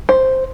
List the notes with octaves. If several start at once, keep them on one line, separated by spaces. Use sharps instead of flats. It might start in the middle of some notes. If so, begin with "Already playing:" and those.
C5